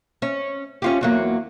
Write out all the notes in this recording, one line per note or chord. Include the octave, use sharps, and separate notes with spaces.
C#4
C#4 F4 G4
E2 F#3 A#3